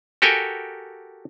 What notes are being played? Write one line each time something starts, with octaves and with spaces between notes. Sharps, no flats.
F#4 G4 A4 A#4 G5 G#5